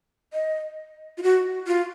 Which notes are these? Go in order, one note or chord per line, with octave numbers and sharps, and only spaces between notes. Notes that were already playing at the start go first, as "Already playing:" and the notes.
D#5
F4
F#4
F4